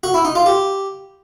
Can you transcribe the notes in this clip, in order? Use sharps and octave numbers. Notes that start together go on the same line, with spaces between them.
F#4
E4
D#4
F4
G4